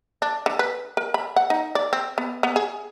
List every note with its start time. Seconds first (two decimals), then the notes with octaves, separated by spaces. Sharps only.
0.22 D4
0.46 D3
0.59 B4
0.97 A#4
1.14 B5
1.36 F#5
1.50 D#4
1.75 D5
1.93 C4
2.18 B3
2.43 B3
2.56 G#4